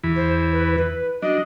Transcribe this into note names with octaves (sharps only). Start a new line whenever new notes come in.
E2 E3 B5
C5
B4
B4
F#3 D4 D#5